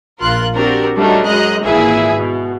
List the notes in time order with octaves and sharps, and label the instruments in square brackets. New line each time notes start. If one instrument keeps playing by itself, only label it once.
[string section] A#1 F4 A#4 C6 F#6
C4 D4 F#4 G4 A#4
F#3 G3 A3 D4 D#4
F#2 G#3 D#5 A#5 F#6
G#1 A#2 E3 E4 G#4 E5
B2